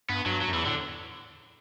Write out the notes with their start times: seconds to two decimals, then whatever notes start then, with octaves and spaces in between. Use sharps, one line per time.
0.09 G2 B3
0.26 G2 F#3
0.41 F#3
0.48 F#2
0.53 E2 E3
0.65 A2 D3